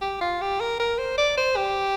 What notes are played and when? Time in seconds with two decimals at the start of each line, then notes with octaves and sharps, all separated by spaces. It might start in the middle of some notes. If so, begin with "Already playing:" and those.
0.01 G4
0.21 F4
0.41 G4
0.60 A#4
0.79 A#4
0.98 C5
1.17 D5
1.37 C5
1.56 G4